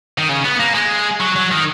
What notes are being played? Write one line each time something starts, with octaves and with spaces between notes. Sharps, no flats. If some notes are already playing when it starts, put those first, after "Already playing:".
D#3
C#3
B3
A#3
G#3
F#3
F#3
D#3